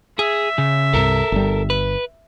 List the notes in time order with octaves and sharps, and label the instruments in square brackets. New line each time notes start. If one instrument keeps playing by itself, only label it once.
[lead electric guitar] G#4 [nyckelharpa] E5
[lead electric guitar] C#3
[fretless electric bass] C2 G2 C3 [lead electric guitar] A4 A#4
[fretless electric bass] G1 G3
[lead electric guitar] B4